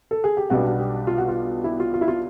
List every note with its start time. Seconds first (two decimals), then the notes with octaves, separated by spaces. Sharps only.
0.11 A4
0.24 G#4
0.37 G4
0.50 B1 B2 G3 B3 D4 F#4
0.66 F#4
0.79 G4
1.07 F4
1.18 F#4
1.28 F4
1.64 E4
1.80 F4
1.94 F4
2.01 E4
2.08 F4